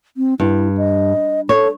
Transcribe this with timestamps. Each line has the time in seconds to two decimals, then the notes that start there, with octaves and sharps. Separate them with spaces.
0.17 C4
0.40 G2 E4
0.77 D#5
1.49 A4 C#5